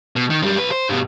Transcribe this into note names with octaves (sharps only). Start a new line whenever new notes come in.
B2
D#3
F#2 G3
B1 B4
C5
G2 B2